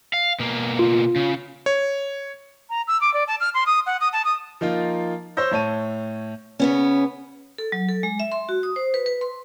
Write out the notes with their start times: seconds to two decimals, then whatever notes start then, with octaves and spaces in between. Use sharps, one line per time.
0.13 F5
0.39 B2 A#3
0.79 F4
1.16 C#3
1.66 C#5
2.70 A#5
2.88 E6
3.01 D6
3.14 D5
3.27 A5
3.40 F6
3.54 C6
3.66 D#6
3.86 F#5
4.01 D#6
4.13 A5
4.25 D#6
4.61 F3 A#3 D#4 F4
5.37 C5 C#5 E6 G6 A#6
5.51 A2 C#5 A5 D#7
6.60 C#3 B3 C#4
7.58 A4
7.72 F#3
7.89 A4
8.03 G#3
8.20 E5
8.32 C6
8.49 F#4
8.63 D#6
8.76 C5
8.94 B4
9.06 B4
9.21 C6